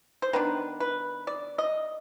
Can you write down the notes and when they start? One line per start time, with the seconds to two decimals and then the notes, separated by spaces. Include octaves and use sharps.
0.22 C5
0.33 D#3 B3 D4 B4
0.80 B4
1.27 D5
1.58 D#5